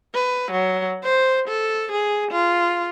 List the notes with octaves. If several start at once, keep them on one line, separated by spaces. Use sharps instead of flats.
B4
F#3
C5
A4
G#4
F4